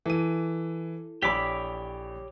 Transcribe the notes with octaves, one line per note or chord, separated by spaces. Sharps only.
E3 E4 A4 D#7
A#1 G4 C#5 B5 D6 E6 B6